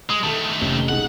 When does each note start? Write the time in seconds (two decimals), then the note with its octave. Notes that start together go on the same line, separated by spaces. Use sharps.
0.10 G#3 D#6
0.24 D#3 A3 A4 A5
0.61 F1 C#4 G7
0.89 B1 G#3 D#4 F#5